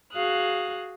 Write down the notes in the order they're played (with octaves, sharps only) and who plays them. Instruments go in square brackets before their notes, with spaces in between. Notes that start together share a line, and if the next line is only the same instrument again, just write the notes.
[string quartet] F#4 G#4 F5 D#6 F#6